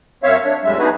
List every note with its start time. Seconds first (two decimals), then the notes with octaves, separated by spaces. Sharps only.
0.23 F#2 C4 C#5 E5 F5
0.44 D4 C#5
0.64 F2 A2 G3 G#3 E5
0.79 B3 D4 D#4 F#4 G#4 B4